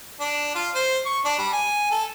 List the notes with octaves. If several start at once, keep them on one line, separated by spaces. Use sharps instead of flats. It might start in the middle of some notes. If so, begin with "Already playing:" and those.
D4
F4
C5
C#6
D4
G3
G#5
A4